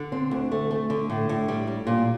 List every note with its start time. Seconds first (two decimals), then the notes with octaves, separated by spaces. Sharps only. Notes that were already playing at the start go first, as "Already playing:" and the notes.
Already playing: D3
0.12 C4
0.31 D2
0.52 A3
0.71 A3
0.90 D3
1.09 A2
1.29 A2
1.48 G3
1.67 G3
1.87 A#2